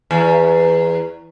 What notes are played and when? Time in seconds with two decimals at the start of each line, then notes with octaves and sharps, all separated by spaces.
0.11 E2